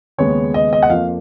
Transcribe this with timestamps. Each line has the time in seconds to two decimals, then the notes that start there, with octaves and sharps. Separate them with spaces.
0.18 D#2 C#3 G#3 B3 C#5
0.54 D#5
0.73 D#5
0.83 F#5
0.89 F2 F3 A#3 F5